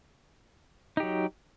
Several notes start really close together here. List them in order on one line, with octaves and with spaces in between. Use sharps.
D#4 G4 F#3